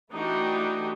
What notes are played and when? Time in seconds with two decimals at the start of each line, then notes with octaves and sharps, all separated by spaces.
0.11 E3 A3 D4 D#4 F#4 G4